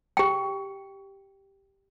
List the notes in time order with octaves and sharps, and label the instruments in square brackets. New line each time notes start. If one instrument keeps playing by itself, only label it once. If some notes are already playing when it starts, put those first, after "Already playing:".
[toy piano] G4 G5